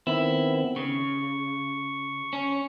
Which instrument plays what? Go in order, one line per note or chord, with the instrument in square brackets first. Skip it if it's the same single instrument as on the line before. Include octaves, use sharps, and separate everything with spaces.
[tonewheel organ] D#3 B3 C4 [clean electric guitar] E4
[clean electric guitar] C#3 [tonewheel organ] C#6
[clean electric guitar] C#4